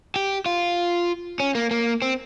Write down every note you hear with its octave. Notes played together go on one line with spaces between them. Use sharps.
G4
F4
C#4
A#3
A#3
C4